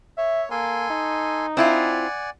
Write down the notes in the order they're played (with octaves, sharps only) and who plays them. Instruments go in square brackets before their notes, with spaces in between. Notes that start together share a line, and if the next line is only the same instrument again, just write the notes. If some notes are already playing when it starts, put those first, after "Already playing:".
[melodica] C#5 [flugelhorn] E5
[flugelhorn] A#3 [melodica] A4 G#5 C6
[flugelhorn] D#4
[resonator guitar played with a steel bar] C4 E4 F4 [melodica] D5 F#5 G#5